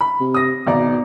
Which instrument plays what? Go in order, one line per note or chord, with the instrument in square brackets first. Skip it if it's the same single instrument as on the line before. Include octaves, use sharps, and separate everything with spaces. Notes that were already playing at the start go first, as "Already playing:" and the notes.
[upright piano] B5
[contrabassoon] C3
[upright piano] D#6 A#6
[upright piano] G#1 D5 A#5 [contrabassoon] B2